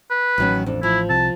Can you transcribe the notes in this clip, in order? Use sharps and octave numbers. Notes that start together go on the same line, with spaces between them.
B4
A1 D#3 F#3 C#4
F2 D4
F3 E4
C2 C3 A5